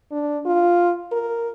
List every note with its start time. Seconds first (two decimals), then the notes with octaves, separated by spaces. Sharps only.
0.12 D4
0.46 F4
1.12 A#4